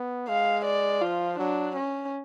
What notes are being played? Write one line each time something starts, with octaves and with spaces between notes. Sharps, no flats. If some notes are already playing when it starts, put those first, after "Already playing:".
Already playing: B3
G#3 F5
D5
F3 F4
F#3 D4
C#4